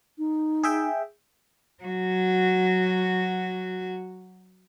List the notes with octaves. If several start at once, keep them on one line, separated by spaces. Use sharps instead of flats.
D#4
G#4 E5 G5
F#3 F#4